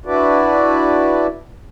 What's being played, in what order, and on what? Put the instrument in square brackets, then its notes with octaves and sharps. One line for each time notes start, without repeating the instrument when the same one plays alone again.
[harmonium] D4 E4 F#4 B4 D5